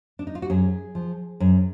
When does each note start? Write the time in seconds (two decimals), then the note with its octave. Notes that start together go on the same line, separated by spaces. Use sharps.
0.19 D4
0.27 D#4
0.35 F4
0.42 F#4
0.50 F#2 G#4
0.95 F3
1.40 F#2